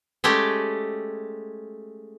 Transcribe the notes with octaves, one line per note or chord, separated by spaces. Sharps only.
G#3 A3 C#4 G4